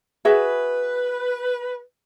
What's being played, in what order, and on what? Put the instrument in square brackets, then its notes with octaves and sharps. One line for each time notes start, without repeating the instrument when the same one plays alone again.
[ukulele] F#4 G#4 E5 [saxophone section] B4